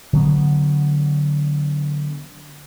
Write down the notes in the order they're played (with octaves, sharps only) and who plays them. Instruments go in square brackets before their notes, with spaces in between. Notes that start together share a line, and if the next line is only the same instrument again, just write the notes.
[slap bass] D3 F#3 B3